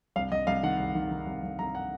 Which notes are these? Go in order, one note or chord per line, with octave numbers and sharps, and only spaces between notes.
C2 F5
C2 D#5
C2 F5
D#3 F#5
C2
D#3
D#3
C2
C2
C2 A#5
F#5